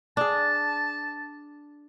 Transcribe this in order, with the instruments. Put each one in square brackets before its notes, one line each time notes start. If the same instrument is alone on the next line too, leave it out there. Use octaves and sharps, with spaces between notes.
[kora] D4 G#4 [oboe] A5